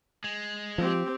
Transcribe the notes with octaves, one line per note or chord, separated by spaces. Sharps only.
G#3
F3 C4 G4